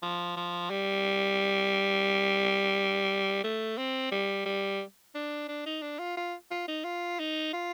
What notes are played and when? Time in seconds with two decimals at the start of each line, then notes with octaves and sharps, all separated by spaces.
0.03 F3
0.37 F3
0.70 G3
3.44 A3
3.78 C4
4.11 G3
4.46 G3
5.15 D4
5.48 D4
5.66 D#4
5.82 D4
5.99 F4
6.17 F4
6.51 F4
6.68 D#4
6.84 F4
7.20 D#4
7.53 F4